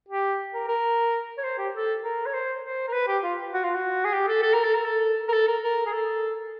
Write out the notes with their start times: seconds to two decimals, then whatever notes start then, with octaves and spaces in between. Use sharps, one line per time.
0.09 G4
0.54 A#4
0.68 A#4
1.38 C#5
1.43 C5
1.58 G4
1.74 A4
2.03 A#4
2.26 C#5
2.33 C5
2.63 C5
2.87 A#4
2.92 B4
3.07 G4
3.23 F4
3.53 F#4
3.63 F4
3.74 F#4
4.04 G#4
4.13 G4
4.28 A4
4.42 A4
4.53 A#4
4.64 A4
4.74 A#4
4.85 A4
5.28 A#4
5.33 A4
5.47 A#4
5.63 A#4
5.86 G#4
5.92 A4